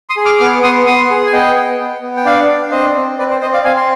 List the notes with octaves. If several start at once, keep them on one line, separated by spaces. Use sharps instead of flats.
C6 D#6
G#4
D6 F6
B3 D6 F6
B3 C6 D#6
B3 C6 D#6
G#4
G#5
B3 D#5 G5
B3
B3
B3
G5
D4 D5 F5
D4
C4 C5 D#5
C4
C4 B4 D5
C5
C4 C5 D#5
D5 F5
C4 F5 G#5
C6